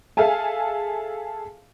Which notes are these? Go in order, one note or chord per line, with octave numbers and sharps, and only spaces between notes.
G#4 A4 E5 F5 G#5 A5